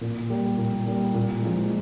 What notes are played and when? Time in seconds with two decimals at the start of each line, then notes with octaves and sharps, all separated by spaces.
0.01 A#2
0.30 G3 A#3
0.58 A#2
0.86 G3 A#3
1.14 A#2
1.42 F3 G#3